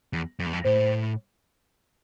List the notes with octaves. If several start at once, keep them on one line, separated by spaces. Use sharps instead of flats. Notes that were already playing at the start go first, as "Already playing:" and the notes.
E2
F2
E2
F2
A2 C5